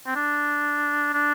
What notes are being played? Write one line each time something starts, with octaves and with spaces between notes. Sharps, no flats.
C4
D4
D4